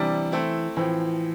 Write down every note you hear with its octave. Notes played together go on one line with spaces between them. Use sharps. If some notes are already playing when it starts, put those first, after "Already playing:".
Already playing: C3 E3 G3 D4
A3 C4 E4
A2 E3 F3 C4